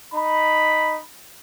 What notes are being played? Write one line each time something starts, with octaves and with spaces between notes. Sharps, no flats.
D#4 B5